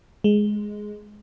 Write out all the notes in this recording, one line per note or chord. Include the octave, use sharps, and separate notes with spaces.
G#3